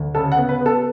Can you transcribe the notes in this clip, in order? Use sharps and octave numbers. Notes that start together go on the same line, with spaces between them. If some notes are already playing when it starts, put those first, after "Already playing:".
Already playing: D2
C#3 A4
F#5
B3
B4
B3 A4